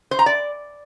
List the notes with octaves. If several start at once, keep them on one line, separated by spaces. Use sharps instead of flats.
C5
A#5
D5